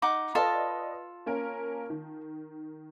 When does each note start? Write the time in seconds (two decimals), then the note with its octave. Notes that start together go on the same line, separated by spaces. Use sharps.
0.02 D#4 F#5 D6
0.35 F4 A4 B4 D5 D#5
1.26 A#3 C#4 A#4
1.90 D#3